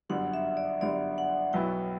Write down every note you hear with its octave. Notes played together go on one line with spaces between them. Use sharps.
G1 F#2 D3 G3 F#5
E5
D5
G1 F#2 D3 G3 D5
F#5
B1 B2 F#3 B3 E4 G5